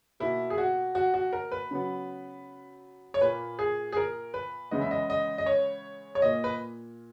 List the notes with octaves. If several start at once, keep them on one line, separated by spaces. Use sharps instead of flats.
B2 A#3 E4
G#4
F#4
F#4
F#4
A#4
B4
C#3 F#3 B3
C#5
A#2 A#3 B4
G#4
G#4
A#4
B4
C#3 E3 G#3 B3 D#5
E5
D#5
D#5
D#5
C#5
C#5
A#2 A#3 D#5
B4